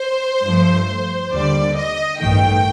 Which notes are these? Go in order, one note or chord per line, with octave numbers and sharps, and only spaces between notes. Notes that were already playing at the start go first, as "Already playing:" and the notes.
Already playing: C5
G2 F3 A3
D#2 D3 G3 D5
D#5
A1 G2 D#3 A3 G5